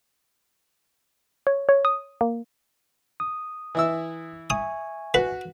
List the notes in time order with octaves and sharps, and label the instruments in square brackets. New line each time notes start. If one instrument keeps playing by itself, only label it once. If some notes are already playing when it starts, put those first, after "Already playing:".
[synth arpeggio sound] C#5
C#5
D#6
A#3
[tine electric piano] D#6
[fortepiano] E3 E4 E6
[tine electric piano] E5 G#5 C#6 [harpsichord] D#6
[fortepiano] F#4 [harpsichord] B4